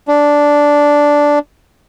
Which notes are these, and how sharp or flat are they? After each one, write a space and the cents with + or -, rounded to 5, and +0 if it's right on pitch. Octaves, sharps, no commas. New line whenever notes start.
D4 -5